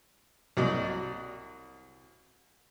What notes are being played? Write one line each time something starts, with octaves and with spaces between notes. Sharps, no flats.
C2 F#3 D5 D#5